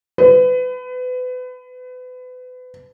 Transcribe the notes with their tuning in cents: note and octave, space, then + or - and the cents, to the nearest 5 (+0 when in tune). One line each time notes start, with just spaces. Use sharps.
B4 +30